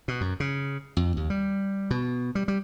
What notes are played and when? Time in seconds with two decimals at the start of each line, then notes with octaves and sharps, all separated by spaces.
0.08 B2
0.21 F#2
0.40 C#3
0.97 F2
1.17 D#2
1.30 G3
1.91 B2
2.35 G3
2.48 G3